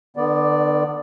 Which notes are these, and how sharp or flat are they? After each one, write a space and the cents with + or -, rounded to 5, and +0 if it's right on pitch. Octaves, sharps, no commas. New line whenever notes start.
D3 +40 B3 +0 D5 +0